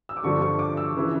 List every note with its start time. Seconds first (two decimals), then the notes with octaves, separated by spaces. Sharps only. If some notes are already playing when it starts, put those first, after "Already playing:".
0.09 E6
0.17 D6
0.23 G2 D3 F3 C#6
0.42 C#6
0.59 D6
0.77 E6
0.96 C#3 E3